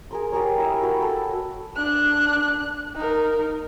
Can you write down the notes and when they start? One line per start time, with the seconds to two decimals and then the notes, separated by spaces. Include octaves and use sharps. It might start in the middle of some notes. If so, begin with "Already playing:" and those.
0.11 G#4 A#4 C6
0.32 G4 G#4 A#4 C#5
0.58 E4 A#4 E6
0.83 F#4 G5 B5
1.02 A4
1.76 D4 F#6
2.95 D#4 A#4